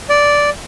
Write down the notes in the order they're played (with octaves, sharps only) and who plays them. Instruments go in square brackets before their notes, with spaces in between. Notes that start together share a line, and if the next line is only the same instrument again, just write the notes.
[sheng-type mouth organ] D5